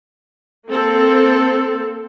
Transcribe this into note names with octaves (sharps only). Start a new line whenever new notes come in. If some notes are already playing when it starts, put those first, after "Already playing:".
A#3 C4 A4